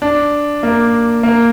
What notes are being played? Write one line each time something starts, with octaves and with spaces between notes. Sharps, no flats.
D4
A#3
A#3